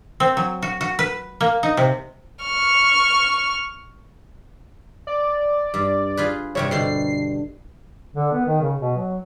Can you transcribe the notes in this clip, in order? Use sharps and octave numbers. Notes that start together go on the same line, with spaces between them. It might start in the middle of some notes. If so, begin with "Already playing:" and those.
C4
F#3
F#4
F#4
B4
A#3
D#4
C3
C#6 F6
D5
G2
F4 G#4 B4
G2 C3 G3 C#5
B2 D3 C7
D3
B3
D#3
C#3
B2
F#3